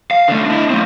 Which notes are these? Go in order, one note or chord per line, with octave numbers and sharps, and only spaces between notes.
F5
D3 A3
D4 E4
A3 C4